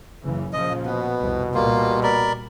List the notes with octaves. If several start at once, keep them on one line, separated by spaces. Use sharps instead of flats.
F#1 C#3 E3
A#2 C#3 F3 D#5
B2 B3
C2 F2
A#2 G3 A#3 F4
A#4 D5 B5